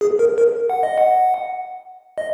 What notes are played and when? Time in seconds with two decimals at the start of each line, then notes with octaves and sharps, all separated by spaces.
0.01 G#4
0.19 A#4
0.38 A#4
0.70 F#5
0.83 D#5
0.98 F#5
2.18 D#5